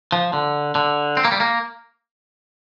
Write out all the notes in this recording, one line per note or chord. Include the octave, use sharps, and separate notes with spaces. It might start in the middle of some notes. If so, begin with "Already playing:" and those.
F3
D3
D3
C4
A#3
G3
A#3